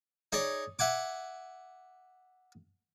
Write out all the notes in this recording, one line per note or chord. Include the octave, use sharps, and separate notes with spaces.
D#4 G#4 C#5 D5
E5 F#5 G#5 D6